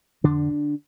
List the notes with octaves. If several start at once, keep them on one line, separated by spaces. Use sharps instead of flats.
F2 D3 D4
D3